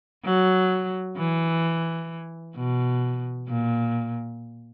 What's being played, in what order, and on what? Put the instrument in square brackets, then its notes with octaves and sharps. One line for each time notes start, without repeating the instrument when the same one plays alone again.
[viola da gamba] F#3
E3
B2
A#2